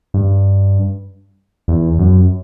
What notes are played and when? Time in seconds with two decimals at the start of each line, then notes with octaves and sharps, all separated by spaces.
0.14 G2
1.68 E2
1.99 F#2